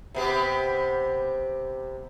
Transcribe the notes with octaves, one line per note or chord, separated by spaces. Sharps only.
C3 B3 G4